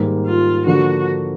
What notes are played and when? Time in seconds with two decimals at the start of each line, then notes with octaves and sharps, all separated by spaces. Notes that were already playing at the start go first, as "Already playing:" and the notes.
Already playing: G#2 D#3 G3 A#3
0.26 F4
0.66 D3 F3 A#3 D4 F#4